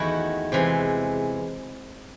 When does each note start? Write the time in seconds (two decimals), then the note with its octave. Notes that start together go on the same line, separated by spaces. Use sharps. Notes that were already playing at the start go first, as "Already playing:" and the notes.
Already playing: E2 D#3 A3 E4 F#4
0.52 C3 E3 G#3